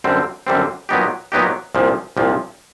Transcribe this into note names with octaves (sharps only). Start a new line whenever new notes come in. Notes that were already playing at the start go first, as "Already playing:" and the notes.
F#2 D3 G3 C4
F#2 D3 G3 C4
A#2 F#3 B3 D#4 G4
A#2 F#3 B3 D#4 G4
C2 A#2 F3
C2 A#2 F3